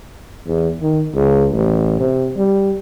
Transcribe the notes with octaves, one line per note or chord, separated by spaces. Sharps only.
E2
D#3
C#2
A1
C3
G3